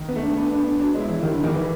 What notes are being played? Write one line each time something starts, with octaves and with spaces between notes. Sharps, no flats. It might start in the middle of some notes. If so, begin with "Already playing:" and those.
Already playing: D#3
B3
A3
D4
B3 D4
D4
B3
D4
F#3 D4
G#3
E4
E3
D#3 G3
D3
E2 D#3
E3